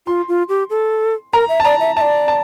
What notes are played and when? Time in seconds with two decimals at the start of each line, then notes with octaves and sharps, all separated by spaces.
0.07 F4 C6
0.28 F4
0.49 G4
0.70 A4
1.33 A#4 A#5
1.49 E5
1.60 A5
1.64 D5 A#5
1.80 E5
1.97 E5 A5
2.01 D5
2.28 A5